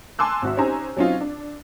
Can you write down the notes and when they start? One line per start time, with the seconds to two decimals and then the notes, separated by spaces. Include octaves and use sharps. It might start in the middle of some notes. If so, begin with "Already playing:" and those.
0.19 G#5 A5 C6 D6 E6 F#6
0.42 G#1 F#4 E5
0.57 C#4 D#4 G4 C5 G#5 A#5
0.97 F#3 C4 C#4 D#4 F4
1.21 D4